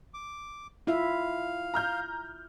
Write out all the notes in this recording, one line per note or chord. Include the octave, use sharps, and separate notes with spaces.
D6
E4 F4 E5 F5
A#5 F6 G6